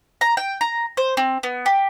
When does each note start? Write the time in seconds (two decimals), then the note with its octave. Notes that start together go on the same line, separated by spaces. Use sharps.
0.21 A#5
0.37 G5
0.61 A#5
0.97 C5
1.17 C4
1.43 B3
1.66 G4